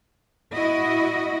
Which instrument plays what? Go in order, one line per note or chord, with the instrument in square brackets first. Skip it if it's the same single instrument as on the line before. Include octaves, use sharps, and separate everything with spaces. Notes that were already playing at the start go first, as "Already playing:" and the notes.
[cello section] E4 F#4 D#5